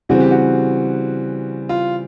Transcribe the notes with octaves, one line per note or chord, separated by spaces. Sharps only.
C#3 E3 G3 C4 F#4
G4
F#4
F4